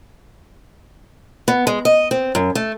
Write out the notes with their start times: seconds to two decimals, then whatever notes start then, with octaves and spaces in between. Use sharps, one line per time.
1.48 B3
1.67 G#3
1.85 D#5
2.11 C4
2.35 F#2
2.55 A3